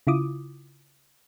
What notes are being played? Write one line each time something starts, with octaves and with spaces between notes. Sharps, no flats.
C#3 E4 F4 D6 D#6